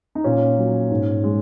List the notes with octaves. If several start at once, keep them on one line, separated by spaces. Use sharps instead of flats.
D#4
A#2 C#4
F#3
G#2
G#3